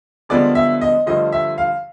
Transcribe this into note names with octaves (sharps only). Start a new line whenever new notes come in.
G2 D3 F3 G#3 B3 D5
E5
D#5
G2 D3 F3 A3 D#5
E5
F5